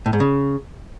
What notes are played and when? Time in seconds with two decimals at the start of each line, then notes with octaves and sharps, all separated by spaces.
0.06 A2
0.13 G#2
0.20 C#3